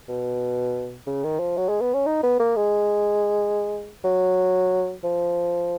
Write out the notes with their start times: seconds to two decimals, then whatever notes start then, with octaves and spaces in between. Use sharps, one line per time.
0.08 B2
1.07 C#3
1.24 D#3
1.40 F3
1.57 F#3
1.69 G#3
1.81 B3
1.94 C#4
2.06 D#4
2.23 B3
2.40 A#3
2.56 G#3
4.04 F#3
5.04 F3